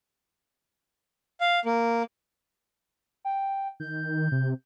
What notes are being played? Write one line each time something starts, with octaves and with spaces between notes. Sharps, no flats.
F5
A#3
G5
D#3 G6
C3